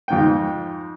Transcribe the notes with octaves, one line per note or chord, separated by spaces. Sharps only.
F2 G#2 G5